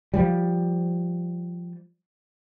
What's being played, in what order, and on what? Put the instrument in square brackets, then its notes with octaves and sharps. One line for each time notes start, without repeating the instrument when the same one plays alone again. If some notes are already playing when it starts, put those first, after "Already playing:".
[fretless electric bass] F3 G3